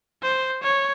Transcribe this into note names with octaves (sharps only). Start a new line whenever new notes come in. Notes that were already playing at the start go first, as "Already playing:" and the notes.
C5
C#5